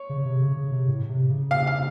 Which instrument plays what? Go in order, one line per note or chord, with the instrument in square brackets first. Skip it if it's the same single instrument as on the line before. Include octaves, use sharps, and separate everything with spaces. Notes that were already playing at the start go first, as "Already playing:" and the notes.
Already playing: [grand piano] C#5
[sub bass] C#3
C3
C#3
C#3
C3
A2
C3
C#3
[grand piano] F5
F5